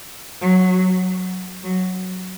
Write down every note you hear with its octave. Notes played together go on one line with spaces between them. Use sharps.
F#3
F#3